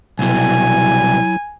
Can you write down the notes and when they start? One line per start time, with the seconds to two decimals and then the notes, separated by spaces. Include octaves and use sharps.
0.19 C2 B2 F#3 E4 G#5